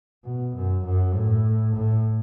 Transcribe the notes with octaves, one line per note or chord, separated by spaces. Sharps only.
B2
F#2
F#2
A2
A2